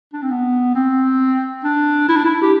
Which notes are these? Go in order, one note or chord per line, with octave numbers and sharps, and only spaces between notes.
D4
C4
B3
C4
D4
E4
D4
E4
G4